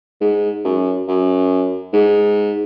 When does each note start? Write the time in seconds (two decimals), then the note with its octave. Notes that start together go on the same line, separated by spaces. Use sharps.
0.21 G#2
0.65 F#2
1.08 F#2
1.93 G#2